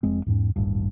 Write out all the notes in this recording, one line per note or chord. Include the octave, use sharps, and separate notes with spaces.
F1 G#3 C4
E2 G#2 C#4
D#1 A1 G2